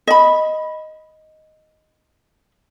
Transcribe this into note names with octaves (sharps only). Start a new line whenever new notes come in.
D#5 B5